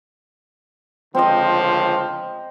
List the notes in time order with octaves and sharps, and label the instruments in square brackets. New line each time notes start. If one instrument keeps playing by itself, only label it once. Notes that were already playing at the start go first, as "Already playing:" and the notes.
[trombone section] C#2 D3 F3 [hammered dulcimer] C4 D#5